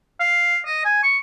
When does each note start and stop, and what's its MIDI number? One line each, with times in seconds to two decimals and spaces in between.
0.20 0.60 77
0.66 0.82 75
0.85 1.03 80
1.03 1.18 85